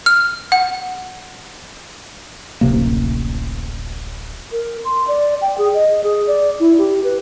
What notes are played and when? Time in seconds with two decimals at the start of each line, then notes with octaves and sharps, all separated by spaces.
0.06 F6
0.52 F#5
2.61 D1 A1 C3 A#3
4.52 A#4
4.85 C6
5.08 D5
5.42 G5
5.58 G#4
5.74 D#5
6.04 G#4
6.27 D5
6.60 E4
6.78 G4
7.04 B4